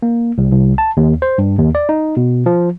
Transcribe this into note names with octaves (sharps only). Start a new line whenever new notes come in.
A#3
C2
C2
A5
D#2
C5
G2
D#2
D5
D#4
B2
F3